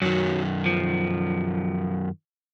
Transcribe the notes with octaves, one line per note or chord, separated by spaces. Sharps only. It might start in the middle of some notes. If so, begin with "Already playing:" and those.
F#2 D#3 F#3
F3